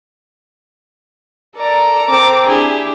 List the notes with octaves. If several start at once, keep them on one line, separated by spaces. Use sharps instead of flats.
A4 A#4 D5 A#5
C4 D6
D4 E4 G4 G#4